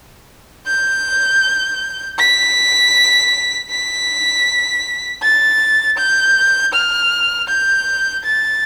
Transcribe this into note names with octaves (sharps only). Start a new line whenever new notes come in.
G6
B6
B6
A6
G6
F6
G6
A6